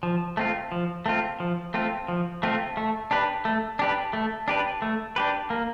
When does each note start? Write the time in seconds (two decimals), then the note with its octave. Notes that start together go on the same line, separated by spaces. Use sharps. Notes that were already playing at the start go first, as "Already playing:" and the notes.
0.03 F3
0.37 A3 C4 F4
0.72 F3
1.06 A3 C4 F4
1.40 F3
1.74 A3 C4 F4
2.08 F3
2.43 A3 C4 F4
2.77 A3
3.11 D4 G4 B4
3.45 A3
3.79 D4 G4 B4
4.13 A3
4.48 D4 G4 B4
4.82 A3
5.16 D4 G4 B4
5.50 A#3